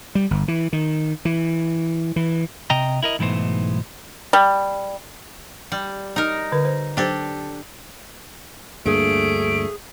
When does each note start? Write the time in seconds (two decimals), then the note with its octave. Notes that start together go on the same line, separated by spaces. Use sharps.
0.15 G3
0.31 G1
0.48 E3
0.73 D#3
1.25 E3
2.16 E3
2.70 C3 D#5 G5 A#5
3.03 E4 A#4 D#5
3.19 B1 G#2 E3 A3 B3 C5
4.33 G3
5.72 G3
6.16 D#4 A#4
6.52 D3 B4
6.65 C5
6.97 F#3 D4 G4 A4 C5
8.86 D2 G2 A3 A#3 G#4 D7